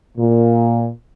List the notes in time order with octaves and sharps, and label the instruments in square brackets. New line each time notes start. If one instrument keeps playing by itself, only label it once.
[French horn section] A#2